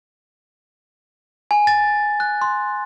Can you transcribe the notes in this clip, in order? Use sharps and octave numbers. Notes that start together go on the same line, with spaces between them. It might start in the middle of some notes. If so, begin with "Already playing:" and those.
G#5
A6
F#6
C6